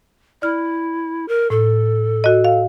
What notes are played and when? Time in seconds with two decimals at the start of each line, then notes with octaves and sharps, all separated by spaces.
0.42 E4 D5 F6
1.28 A#4
1.50 A2 A4
2.24 F#4 D#5
2.44 F5